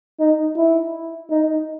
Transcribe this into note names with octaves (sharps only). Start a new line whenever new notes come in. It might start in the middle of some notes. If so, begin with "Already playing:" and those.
D#4
E4
D#4